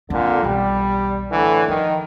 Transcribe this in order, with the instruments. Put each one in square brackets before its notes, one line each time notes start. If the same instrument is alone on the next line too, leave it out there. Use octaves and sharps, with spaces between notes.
[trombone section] A#2 D3 [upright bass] C4
[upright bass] B1 E2 [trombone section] G3
[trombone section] A2 D3 E3
[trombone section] D#3 [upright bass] F3